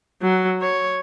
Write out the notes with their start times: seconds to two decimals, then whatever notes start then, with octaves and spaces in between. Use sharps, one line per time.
0.22 F#3
0.61 C#5